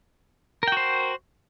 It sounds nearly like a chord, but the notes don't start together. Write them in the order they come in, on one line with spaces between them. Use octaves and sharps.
A#4 G5 F#4 C5